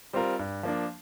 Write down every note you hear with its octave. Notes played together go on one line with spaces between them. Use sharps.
G3 C4 F4 A#4
G2
F3 A#3 D4